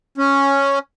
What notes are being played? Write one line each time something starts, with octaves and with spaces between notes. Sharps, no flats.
C#4